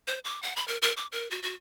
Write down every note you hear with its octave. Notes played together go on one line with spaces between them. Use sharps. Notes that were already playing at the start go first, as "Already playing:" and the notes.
C5
D6
F#5
B5
A#4
A#4
D6
A#4
F#4
F#4